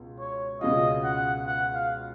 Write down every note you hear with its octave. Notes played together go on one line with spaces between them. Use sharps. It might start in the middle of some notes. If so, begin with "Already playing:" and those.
Already playing: C#2 B2
C#5
C#2 B2 G#3 C#4 F4 D#5
F#5
F#5
F5